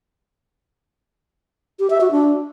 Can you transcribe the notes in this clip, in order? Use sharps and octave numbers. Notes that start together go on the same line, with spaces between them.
G4
E5
F#4
D4